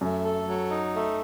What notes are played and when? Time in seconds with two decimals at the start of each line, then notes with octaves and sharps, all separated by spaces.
0.01 F#2 A3
0.25 A4
0.47 F#3
0.70 D#4
0.94 A3